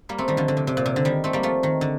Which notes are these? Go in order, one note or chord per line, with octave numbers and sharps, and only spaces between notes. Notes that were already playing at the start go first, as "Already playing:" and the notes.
G3 A#3
A3 C4
D#3 G3
D3 F3
D3
C3
C3
A#2
C3
D3
D#3 G3
A3 C4
G3 A#3
F3 A3
D#3
D3